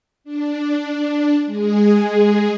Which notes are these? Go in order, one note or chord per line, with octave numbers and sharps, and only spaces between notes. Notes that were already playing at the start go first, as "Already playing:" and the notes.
D4
G#3 G#4